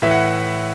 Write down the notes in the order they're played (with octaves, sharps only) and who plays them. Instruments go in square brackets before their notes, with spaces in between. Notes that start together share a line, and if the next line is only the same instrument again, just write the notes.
[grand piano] A2 E3 E5
F#5